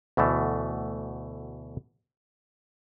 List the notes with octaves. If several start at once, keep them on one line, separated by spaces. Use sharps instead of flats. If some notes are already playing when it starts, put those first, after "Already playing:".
D2 B2 E3 A3